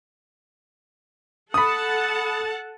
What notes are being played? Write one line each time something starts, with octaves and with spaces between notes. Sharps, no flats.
A4 F#5 A5 B5 D#6